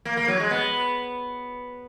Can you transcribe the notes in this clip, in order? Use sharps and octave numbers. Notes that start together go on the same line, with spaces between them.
A#3
A#3
F#3
G#3
B3